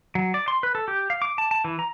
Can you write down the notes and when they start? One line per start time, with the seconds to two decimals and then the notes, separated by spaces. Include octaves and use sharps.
0.15 F#3
0.34 D5
0.48 C6
0.63 B4
0.75 A4
0.88 G4
1.10 F5
1.22 D6
1.38 A5
1.51 A5
1.64 E3
1.79 A#5